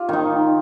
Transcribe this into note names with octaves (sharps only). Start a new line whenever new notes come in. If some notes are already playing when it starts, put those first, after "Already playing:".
Already playing: F4 G4
D#3 D#4